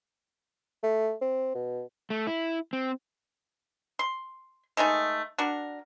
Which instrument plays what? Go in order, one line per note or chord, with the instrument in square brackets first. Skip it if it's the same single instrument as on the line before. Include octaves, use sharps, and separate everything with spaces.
[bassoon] A3
C4
B2
[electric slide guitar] A3
E4
C4
[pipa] C6
D#3 G#3 A3 D#4
D4 F#4 A#4